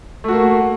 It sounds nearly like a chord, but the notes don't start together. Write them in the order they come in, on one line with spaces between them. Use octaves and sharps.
A3 F#4 A#3